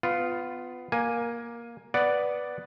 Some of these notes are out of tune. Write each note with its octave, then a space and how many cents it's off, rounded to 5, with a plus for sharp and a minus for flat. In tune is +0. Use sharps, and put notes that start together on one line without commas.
B3 +20 F4 +0
A#3 +10 G#5 +0
B3 +0 D5 +0 F#5 +0